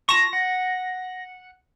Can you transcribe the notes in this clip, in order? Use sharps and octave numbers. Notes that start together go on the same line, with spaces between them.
F4 A5 C#6 A#6
F#5